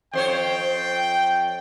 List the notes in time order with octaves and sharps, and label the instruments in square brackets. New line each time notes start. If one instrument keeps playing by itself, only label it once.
[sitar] F2 C5 C#5 [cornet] G5